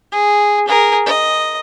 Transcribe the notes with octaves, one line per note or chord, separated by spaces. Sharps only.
G#4
G#4 A#4
D#5